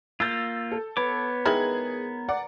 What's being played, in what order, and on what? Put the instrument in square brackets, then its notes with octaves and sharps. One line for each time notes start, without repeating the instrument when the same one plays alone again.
[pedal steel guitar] A#3 F4 [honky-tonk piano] E6 G6 A6
[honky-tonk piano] A4
[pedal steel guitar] B3 C#5 D6 [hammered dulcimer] B4
[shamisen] D#3 G#3 E4 [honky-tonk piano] G#4 G#6 F#7 [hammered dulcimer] A#4
[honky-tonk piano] D5 F#5 D6